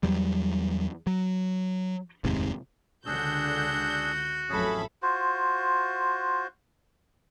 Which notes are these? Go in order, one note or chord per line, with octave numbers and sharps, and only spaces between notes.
E2 F#3 G3
F#3
F1 D#2 G#2 C3
C#2 D3 D4 F#4 G#4 E6 G6
A1 F2 F#3 C#4 G#4 A4 E5 B5
F4 F#4 C5